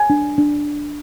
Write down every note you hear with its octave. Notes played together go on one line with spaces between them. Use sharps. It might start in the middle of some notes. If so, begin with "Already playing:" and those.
Already playing: G#5
D4
D4